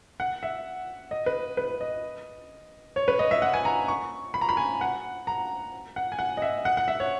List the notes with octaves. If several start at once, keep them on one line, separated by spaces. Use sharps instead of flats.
F#5
E5
D#5
B4
B4
D#5
C#5
B4
D#5
E5
F#5
G#5
A#5
C#6
B5
A#5
B5
G#5
F#5
A#5
F#5
G#5
F#5
D#5
E5
F#5
F#5
E5
C#5